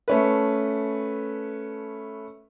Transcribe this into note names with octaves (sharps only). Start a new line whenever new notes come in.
A3 C#4 B4